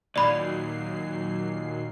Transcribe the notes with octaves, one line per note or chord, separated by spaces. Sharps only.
D#2 A#2 F#3 D5 B5 C7